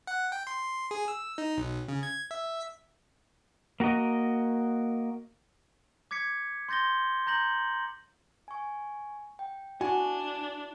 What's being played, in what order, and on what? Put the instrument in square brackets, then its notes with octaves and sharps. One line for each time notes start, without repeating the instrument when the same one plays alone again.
[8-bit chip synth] F#5
G5
C6
C6
G#4
E6
D#4
B1
C#3
G#6
E5
[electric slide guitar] A#3 F#4 A#4 D#5
[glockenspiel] D6 G#6 B6 C#7
C6 G6 A6 A#6 G7
A#5 G6 A#6 F#7
[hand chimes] G#5 C#6
G5
[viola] D4 [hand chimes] E4 [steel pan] F#4 [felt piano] G#5